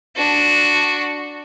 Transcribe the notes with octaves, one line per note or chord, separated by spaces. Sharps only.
D4 F#4